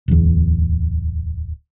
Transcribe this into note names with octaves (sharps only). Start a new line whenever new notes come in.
D1 E2